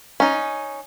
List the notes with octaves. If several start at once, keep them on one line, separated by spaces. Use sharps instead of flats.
C#4 D#4